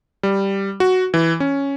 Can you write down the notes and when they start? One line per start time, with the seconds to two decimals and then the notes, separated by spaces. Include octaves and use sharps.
0.23 G3
0.80 F#4
1.14 E3
1.40 C#4